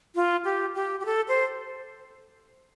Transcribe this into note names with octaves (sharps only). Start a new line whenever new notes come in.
F4
G4
G4
G4
A4
C5